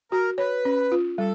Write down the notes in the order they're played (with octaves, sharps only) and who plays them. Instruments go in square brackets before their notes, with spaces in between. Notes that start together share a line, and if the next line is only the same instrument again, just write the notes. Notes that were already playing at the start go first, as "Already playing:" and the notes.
[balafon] F#4 [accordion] A#4
[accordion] B4 [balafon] C#5
[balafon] C#4
F4
[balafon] G3 [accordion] A4